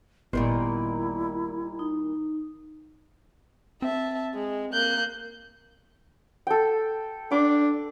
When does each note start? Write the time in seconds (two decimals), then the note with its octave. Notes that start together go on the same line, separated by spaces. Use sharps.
0.33 G#1 A#2 D#3 G3 B3 E4 D5 C6
1.79 D#4
3.82 C4 E5 A5
4.34 G#3
4.73 A#3 F#6 G6
6.47 A4 G5
7.31 D4 D6